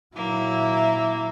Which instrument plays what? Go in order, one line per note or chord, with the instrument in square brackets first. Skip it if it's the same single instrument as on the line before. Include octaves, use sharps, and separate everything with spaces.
[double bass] A#2 F#3 [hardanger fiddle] A#3 [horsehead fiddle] E4 E5